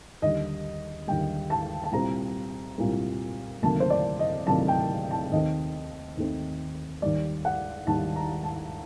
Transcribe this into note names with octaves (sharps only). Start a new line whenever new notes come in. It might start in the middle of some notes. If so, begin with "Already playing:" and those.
D#2 D3 G3 D#5
D#2 D3 G3 G5
A5
A5
C2 A#2 G3 C4 A#5
C2 A#2 G3 C4
D2 C3 D#3 F#3 A#3 A5
C5
D5
D#5
D2 C3 D#3 F#3 A#3 A5
G5
A5
D#2 D#3 A3 C4 D#5
D#2 D#3 A3 C4
D#2 D#3 G3 D5
F#5
D#2 D#3 G3 A5
A#5
A5